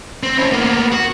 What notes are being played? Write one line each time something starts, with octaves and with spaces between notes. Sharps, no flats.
C4
C#4 E4
A#3 B3
F#4